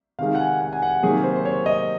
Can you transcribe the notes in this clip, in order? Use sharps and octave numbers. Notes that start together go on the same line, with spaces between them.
C3 D#3 G#3 F5
F#5
G#5
F#5
G#5
F#5
C3 D#3 F#3 A#3 G#4
C5
C5
C#5
D#5